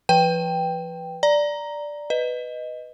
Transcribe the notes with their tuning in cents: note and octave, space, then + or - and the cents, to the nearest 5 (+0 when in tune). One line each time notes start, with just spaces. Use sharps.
F3 -30 B4 +0 G5 +0
D5 +0 A#5 +0
B4 +5 D#5 +0